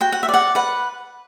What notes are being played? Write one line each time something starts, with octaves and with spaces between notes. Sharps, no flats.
F#4 G5
F#5
E5
D5
F#5
B4 F#5